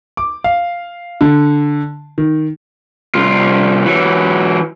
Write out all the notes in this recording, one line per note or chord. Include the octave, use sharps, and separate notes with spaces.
D6
F5
D3
D#3
C2 F4
E3 F#3